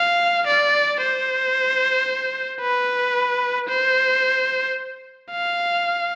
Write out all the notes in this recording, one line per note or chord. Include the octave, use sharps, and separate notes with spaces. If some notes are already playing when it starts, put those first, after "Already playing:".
Already playing: F5
D5
C5
B4
C5
F5